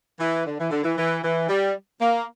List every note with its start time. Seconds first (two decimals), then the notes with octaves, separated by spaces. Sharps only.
0.20 E3
0.46 D3
0.59 E3
0.71 D3
0.84 E3
0.97 E3
1.23 E3
1.49 G3
2.00 A#3